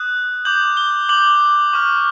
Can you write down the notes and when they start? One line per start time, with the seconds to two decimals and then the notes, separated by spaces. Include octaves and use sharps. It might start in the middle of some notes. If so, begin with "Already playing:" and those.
Already playing: D#6 F#6
0.45 D6 G6 F#7
0.77 G7
1.09 D6 G6 F#7
1.73 C#6 F6